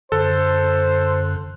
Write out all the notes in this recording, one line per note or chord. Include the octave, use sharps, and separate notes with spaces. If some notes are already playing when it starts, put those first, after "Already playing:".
F#2 D3 A4 C5 F#6